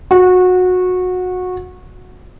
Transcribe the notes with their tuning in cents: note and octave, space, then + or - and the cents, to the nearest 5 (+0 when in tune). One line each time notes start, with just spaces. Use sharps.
F#4 -20